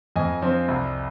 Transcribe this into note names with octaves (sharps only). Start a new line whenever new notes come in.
F2 D#5 G#5
F3 C4
C2